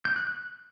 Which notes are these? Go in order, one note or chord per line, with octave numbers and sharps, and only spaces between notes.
G6
F#6
F#6